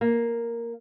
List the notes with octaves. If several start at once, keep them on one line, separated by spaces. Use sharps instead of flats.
A#3